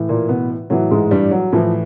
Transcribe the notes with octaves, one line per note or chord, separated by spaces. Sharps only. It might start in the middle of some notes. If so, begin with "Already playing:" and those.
Already playing: A2 E3
A#2 A#3
B2 B3
A2 E3 F#3
G#2 G#3
G2 G3
F#3
A2 E3 F3